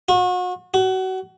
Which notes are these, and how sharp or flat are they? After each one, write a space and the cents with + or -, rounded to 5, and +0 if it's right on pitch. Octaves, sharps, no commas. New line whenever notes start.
F#4 -35
F#4 +30